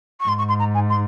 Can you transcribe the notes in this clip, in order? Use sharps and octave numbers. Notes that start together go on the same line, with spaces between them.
C#6
G#2 C6
C#6
C6
A#5
G#5
C6